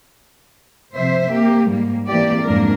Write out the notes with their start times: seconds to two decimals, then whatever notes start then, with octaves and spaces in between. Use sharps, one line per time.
0.94 C3 F3 C5 E5
1.30 A#3 G4
1.69 G#2 G3 A#3
2.09 E3 A#3 C4 G4 D5
2.45 F2 G#2 G3 A#3 D4 A#4